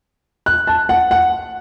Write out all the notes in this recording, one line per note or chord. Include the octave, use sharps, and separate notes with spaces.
F#6
A5
F#5
F#5